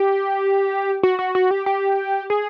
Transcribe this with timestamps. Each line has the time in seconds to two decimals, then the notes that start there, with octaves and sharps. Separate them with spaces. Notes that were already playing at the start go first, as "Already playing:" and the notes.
Already playing: G4
1.03 F#4
1.19 F#4
1.35 F#4
1.51 G4
1.66 G4
2.30 G#4